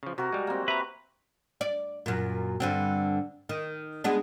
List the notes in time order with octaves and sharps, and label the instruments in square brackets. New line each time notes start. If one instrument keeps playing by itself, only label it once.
[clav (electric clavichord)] C#3 F3
[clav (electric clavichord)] C3 [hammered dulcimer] F#4 G4 A#4
[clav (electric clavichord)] G3 G#3
[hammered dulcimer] A#3 C4
[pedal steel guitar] B4 [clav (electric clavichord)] E5 A#5
[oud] D5
F#2 A#2
G2 D3 C4
D#3
G#3 B3 D4